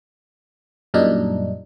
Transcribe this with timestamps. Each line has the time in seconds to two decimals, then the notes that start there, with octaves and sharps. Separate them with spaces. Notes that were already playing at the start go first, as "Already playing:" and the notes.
0.94 F#2 A#2 G3 D4 D#4